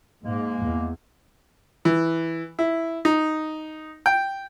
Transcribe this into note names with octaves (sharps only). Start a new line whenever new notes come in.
G#2 G#3 A#3
E2
E3
E4
D#4
G5